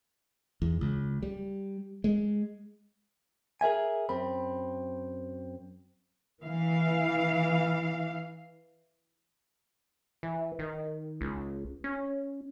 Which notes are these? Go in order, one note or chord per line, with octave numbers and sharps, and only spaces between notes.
E2
C#2
G3
G#3
G#4 A#4 E5 G#5
F#2 C4 B5
E3 F5
E3
D#3
C#2
C#4